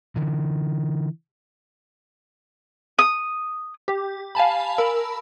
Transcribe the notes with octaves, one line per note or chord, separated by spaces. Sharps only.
D3 E3
D#6
G4
F5 G#5 A5 B5
A#4 B5 E6